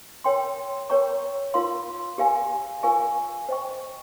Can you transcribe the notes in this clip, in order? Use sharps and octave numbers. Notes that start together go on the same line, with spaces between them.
A#4 C#5 G5 C6
A#4 C#5 G5 A#5 C#6
F4 A#4 F5 C6
G4 A#4 F5 G#5
F4 A#4 F5 G#5 C#6
C5 D#5 G5 C#6